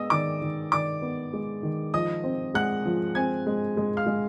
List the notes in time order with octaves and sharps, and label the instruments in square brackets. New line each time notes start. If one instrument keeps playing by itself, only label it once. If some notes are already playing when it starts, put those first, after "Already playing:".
Already playing: [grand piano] G#3 B3 [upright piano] D#5 D#6 E6
[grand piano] D#3 [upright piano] D5 D6
[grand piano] D#3
[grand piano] D#3 [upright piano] D5 D6
[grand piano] B3
G#3
D#3
[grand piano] F3 [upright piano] D#5 D#6
[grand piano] C4
[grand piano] G#3 [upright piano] F#5 F#6
[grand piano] F3
[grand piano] C4 [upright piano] G#5 G#6
[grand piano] G#3
G#3
[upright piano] F5 F6
[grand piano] G#3